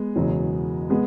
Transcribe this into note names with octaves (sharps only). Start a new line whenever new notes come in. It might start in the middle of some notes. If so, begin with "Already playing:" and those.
Already playing: G#3 B3
F#1 E2 B2 F#3
G#3 B3